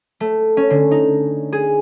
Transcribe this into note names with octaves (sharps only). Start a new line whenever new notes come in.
A3
C#4
D3
D#4
G#4